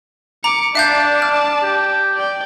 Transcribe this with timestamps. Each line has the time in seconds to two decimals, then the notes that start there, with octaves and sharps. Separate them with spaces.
0.44 A#5 D6 C#7
0.75 D4 D5 E5 F5 A5 G6
1.22 F6
1.63 G4
2.14 D5 G5